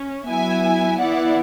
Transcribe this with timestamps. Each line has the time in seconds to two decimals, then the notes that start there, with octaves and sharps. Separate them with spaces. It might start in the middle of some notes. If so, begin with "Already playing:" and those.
Already playing: C#4
0.28 F#3 B3 E4 E5 G#5
0.99 E3 B3 E4 D5 F#5